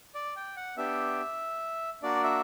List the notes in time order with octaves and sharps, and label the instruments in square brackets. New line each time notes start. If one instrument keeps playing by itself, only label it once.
[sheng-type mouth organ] D5
G5
F#5
B3 D4 G4 E5
A#3 D4 F#4 D5
E5